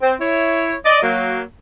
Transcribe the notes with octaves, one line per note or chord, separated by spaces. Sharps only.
C4 C5
E4 C#5
D5 D#5
F#3 A#3